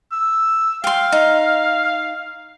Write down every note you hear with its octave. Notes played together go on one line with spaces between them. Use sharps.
E6
F5 G5 C6
D#4